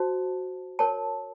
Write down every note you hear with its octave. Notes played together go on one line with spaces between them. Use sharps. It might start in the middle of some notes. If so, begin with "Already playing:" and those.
Already playing: F#4 C5 A5
A#4 C#5 A5